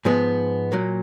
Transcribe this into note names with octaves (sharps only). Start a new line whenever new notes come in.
G#2 F3 G#3 B3
A#2 F#3 A#3